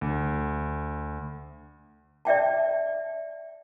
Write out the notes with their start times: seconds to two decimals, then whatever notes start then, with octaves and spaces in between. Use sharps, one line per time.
0.01 D2
2.25 D5 E5 G5 A5